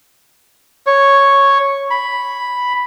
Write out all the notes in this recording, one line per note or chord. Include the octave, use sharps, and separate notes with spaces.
C#5
B5